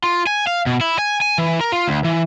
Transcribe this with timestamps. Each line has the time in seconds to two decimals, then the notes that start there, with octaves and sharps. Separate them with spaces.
0.04 F4
0.27 G#5
0.47 F5
0.67 B2
0.81 E4
0.99 G#5
1.21 G#5
1.38 E3
1.61 A#4
1.72 F4
1.88 D2
2.04 E3